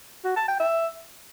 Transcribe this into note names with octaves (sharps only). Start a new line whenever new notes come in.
F#4
A5
G5
E5